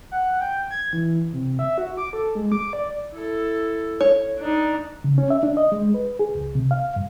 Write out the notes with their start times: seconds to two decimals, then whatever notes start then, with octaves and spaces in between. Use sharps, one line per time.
0.11 F#5
0.41 G5
0.70 G#6
0.93 E3
1.33 C3
1.59 E5
1.78 F#4
1.97 D6
2.13 A4
2.35 G#3
2.52 D6
2.73 D5
3.12 E4 A4
4.01 C#5
4.38 D4 D#4
5.04 C#3
5.18 C#4
5.30 E5
5.43 D4
5.57 D#5
5.72 G#3
5.94 B4
6.19 G#4
6.35 C#2
6.55 C3
6.71 F5
6.96 G2